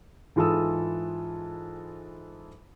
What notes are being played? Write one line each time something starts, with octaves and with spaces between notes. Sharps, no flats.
G#2 E3 F4 A4 D#6 E6